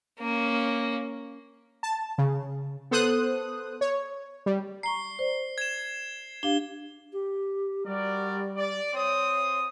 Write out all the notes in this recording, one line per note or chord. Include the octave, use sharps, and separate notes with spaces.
A#3 C#4
A5
C#3
B3 A4 C5 D#6 F#6
C#5
G3
A#5 C#6 C7 G7
C5 D5
G#6 E7
D4 G4 F5 G7
G4
G3 F#4 A#4 D5
D5
C4 C#5 D#6